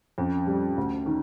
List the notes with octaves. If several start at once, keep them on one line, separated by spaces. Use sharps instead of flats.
F2 C#4
G3
D2
D#3